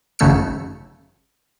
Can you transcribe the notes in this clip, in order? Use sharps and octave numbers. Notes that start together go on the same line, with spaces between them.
G#1 F#2 C#3 A3 E6 C#7